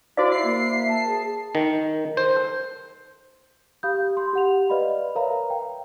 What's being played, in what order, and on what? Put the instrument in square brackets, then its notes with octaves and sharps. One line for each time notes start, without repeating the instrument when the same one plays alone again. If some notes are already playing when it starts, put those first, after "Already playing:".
[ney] E4 [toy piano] F#4 C5 F5 [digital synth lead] D5
[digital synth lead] C7
[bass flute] A#3
[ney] E5
A5
[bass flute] G#4
[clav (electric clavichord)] D#3
C5
[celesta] G4 F5 B5 D#6 G6
C6
G4 F#5 F7
B4 D5 D#5 F5 B5
A#4 B4 C#5 E5 F5 A#5
F5 G5